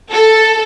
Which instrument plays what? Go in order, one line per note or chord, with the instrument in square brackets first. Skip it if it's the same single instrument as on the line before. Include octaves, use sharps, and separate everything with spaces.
[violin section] A4